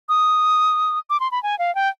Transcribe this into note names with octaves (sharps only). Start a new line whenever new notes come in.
D#6
D6
C6
B5
G#5
F5
G5